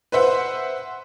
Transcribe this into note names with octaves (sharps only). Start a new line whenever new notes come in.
B4 C5 E5 F#5